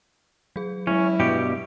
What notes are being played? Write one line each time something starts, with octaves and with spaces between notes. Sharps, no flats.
F#3 G#4
F#3 G#3 C#4 E4
G2 B2 G4 D7